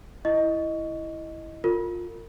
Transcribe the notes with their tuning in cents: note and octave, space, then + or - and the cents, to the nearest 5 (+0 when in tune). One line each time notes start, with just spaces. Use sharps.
E4 +0 D#5 +0 C#6 +15
F4 +20 A#4 -30